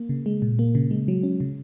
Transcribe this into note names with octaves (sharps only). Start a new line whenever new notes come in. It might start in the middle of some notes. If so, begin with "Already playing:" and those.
Already playing: A#3
C#3
G#3
A#2
A#3
C#3
G#3
F#3
C#4
C#3